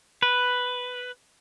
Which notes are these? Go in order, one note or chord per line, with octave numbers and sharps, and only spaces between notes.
B4